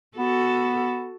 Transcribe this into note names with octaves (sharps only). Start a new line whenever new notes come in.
B3 F#4 A4